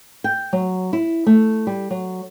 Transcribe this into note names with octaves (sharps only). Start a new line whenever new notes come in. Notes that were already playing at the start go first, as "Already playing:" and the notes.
G5
F#3
E4
A3
G3
F#3